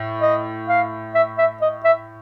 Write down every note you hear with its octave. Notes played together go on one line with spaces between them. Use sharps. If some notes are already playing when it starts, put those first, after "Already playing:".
Already playing: A2
D#5
F5
E5
E5
D#5
E5